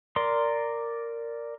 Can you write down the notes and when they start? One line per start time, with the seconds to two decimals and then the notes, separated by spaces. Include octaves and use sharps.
0.16 A#4 D5 C6